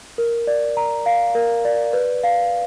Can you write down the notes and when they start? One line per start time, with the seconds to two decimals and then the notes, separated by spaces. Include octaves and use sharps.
0.18 A#4
0.47 D5
0.77 A#5
1.06 F5
1.35 A#4
1.65 D5
1.93 B4
2.23 F5